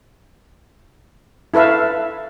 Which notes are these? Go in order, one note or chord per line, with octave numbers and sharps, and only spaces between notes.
E4 A4 B4 E5 F5